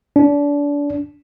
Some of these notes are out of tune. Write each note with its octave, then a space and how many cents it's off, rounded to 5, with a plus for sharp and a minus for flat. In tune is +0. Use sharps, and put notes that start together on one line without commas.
D4 -30